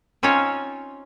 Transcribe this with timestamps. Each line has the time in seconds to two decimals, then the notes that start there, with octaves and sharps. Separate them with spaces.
0.23 C4 C#4 D#4 F4 C#5